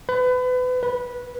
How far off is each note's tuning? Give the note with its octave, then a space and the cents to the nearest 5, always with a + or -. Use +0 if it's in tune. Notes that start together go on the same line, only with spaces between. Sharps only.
B4 +30
B4 -15